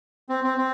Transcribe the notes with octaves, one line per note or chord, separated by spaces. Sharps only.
C4
C4
C4